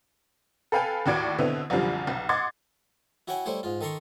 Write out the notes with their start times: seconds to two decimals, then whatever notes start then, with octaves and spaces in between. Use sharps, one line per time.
0.72 A4 B4 F5 G5 G#5
1.06 D#2 A2 F#4 D5 G#6 D7
1.38 B2 D3 B3 C4 E4
1.70 C2 F#2 D3 F3 G3
2.07 B1
2.29 D#5 F#5 C6 D6 G#6 A6
3.28 E4 F#4 C#5 G5 G#5 B5
3.46 G3 A3 E4 C5 C#5
3.63 G#2 F4
3.81 D#3 A4 A#5 C6 C#6